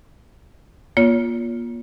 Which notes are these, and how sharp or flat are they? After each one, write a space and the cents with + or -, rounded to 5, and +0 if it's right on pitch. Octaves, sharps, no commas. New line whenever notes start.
A#3 +35 F4 +5 C#5 +30